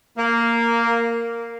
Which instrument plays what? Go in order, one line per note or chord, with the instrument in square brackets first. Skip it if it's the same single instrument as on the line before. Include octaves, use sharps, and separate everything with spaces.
[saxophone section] A#3